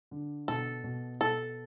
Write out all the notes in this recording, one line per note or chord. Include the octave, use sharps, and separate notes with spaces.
D3
B2 A4
B2
B2 A4